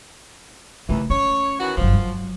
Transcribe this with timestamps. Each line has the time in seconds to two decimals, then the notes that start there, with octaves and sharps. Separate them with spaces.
0.89 D#2 C#3 E3 A3
1.10 C#4 C#5
1.60 D#3 E3 F#4
1.77 G1 F3 F#3
1.93 F#3